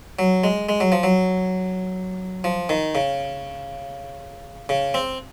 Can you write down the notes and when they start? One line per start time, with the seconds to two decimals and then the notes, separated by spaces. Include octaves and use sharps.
0.19 F#3
0.44 G#3
0.69 G#3
0.80 F#3
0.92 F3
1.03 F#3
2.44 F3
2.69 D#3
2.95 C#3
4.69 C#3
4.94 C4